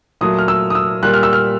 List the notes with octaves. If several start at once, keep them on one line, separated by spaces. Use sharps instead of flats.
A#2 F#3 A3 D#6
F6
E6
D#6
E6
A#2 G3 F#6
F6
E6
F6